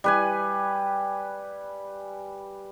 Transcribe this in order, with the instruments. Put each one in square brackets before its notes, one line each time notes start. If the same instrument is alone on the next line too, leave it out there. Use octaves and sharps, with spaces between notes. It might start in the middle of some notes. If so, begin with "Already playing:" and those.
[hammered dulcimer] G3 B4 G#5